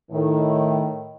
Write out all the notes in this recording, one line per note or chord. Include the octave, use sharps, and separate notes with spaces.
A2 D#3